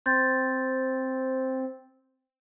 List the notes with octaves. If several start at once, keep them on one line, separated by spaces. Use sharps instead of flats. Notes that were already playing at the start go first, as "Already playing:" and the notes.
C4 C6 G6 A6